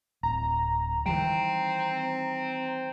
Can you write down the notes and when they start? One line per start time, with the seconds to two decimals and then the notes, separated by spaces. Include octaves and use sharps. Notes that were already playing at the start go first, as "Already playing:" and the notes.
0.23 D1 A#5
1.06 D#3 E3 G3 C5 G5